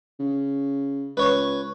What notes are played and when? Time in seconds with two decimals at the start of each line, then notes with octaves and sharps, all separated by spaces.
0.19 C#3
1.17 C#2 B4 C#5